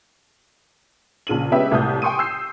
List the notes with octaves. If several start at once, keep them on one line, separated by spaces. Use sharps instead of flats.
A#1 C#3 D#7 F#7
G#3 B3 C#4 G4 B4 E5
C2 A2 A5 D#6 G6
G5 G#5 C6 C#6 D#6 D#7
E6 G6 C7